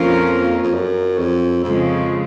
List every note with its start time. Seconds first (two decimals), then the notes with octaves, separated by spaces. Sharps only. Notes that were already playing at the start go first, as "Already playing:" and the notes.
Already playing: F2 F3 A#3 C#4 F4 A#4
0.62 F2
0.74 F#2
1.19 F2
1.64 F2 C#3 F3 G#3